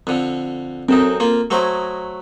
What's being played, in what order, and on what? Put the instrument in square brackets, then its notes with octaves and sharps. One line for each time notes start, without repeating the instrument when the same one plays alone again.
[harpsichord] F2 D3
[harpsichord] F#2 D#4 [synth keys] C4 A4
[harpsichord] A#3 F4
[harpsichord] F#3 A3 C5 [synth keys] A#5 D#6 G#6